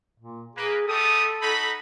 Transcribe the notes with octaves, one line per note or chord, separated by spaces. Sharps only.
A#2
A#3 G#4 B4
G3 A3 A4 D#6
D#4 F#4 B5